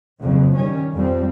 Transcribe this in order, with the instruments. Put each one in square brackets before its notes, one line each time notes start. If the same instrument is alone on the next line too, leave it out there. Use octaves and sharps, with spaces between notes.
[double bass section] F#1 F2 C#3
D#3 G3 C#4
F2 G3 C4